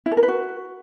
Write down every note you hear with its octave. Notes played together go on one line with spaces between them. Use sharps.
E4
A4
A#4
B4
F#4